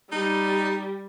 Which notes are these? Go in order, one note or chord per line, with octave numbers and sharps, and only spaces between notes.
G3 D#4